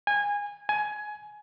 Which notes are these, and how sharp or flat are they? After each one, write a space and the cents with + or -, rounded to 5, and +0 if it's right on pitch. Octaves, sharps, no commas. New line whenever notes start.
G#5 -20
G#5 +20